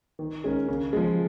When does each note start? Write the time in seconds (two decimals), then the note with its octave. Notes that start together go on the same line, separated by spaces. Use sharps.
0.19 D#3
0.44 G#3 C#4 A#4
0.68 C#3
0.93 F3 G#3